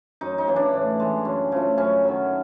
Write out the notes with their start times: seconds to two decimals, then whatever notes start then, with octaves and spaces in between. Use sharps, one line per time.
0.21 F#2 D#4
0.38 D#4
0.47 C#3 E3
0.56 D4
0.74 A2
1.00 E3 G#3
1.25 F#2
1.52 C#3 F3 A3
1.78 F#2 C#4
2.04 D#3 F#3